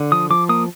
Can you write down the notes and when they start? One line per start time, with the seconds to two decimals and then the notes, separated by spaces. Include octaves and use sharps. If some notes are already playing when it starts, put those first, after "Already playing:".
Already playing: D3
0.12 F3 D#6
0.30 F3 D6
0.49 A#3 D#6